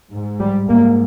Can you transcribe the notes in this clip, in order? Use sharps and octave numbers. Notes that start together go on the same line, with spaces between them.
G#2
G3
G#2 A#3